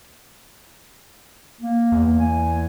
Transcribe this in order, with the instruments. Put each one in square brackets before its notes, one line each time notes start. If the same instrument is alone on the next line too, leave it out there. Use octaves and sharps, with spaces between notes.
[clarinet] A#3
[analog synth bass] E2
[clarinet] G#5